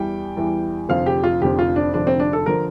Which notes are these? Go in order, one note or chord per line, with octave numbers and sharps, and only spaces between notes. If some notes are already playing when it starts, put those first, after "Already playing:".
Already playing: E2 E3 G3 G5
E2 E3 G3
F1 F2 D3 F3 F5
G4
F4
F1 F2 D3 F3 G4
F4
D4
F1 F2 D3 F3 D4
C4
D4
A4
D3 F3 A#4